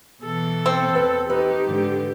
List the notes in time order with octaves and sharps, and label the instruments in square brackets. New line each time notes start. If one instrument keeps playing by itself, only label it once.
[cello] B2 E3 [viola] A4
[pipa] C4
[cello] E2 [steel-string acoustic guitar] B4 G5
[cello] D#4 [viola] G4 [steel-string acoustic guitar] B4
[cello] G#2 D3